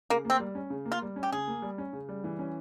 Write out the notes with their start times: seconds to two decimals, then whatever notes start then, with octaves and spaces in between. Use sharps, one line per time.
0.10 C#3 A#3
0.25 A#3 C4
0.40 G3
0.55 C#4
0.70 C#3
0.85 A#3
0.92 F4
1.02 G3
1.16 C#4
1.23 G4
1.32 C#3 G#4
1.48 A#3
1.62 G3
1.78 C#4
1.93 C#3
2.09 G3
2.24 E3
2.39 C#4